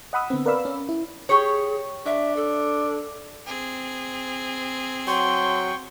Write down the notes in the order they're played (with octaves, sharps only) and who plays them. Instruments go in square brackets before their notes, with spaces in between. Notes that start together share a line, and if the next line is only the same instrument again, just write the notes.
[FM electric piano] D#5 F#5 B5 D#6 E6
D3 B3 C4
A#4 B4 D5 F5 B5 E6
C#4
E4
[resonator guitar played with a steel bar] G4 C#5 [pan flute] G#4
[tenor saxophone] D4 [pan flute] E5
[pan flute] A4
[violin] C4 G#4
[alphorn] F#3 [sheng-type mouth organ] G5 C#6 [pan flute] C6